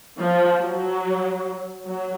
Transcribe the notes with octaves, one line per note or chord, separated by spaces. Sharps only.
F3
F#3
F#3